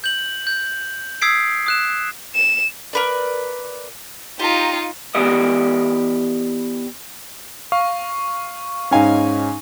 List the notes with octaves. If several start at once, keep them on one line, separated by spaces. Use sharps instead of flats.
G6 F#7
G6
D#6 E6 G#6 B6 C7 D7
D#6 F#6 E7
E7
A#4 B4 D5
D#4 F4 G4 A#5
E3 B3 G4 D5 D#5
F5 C#6
G#2 C#4 D#4 F5 G#5